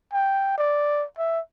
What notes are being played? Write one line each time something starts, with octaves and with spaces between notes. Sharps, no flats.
G5
D5
E5